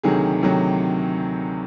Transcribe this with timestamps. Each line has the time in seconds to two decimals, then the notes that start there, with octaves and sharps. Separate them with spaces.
0.03 D2 C3 D#3 F#3 G#4
0.41 D2 C3 D#3 F#3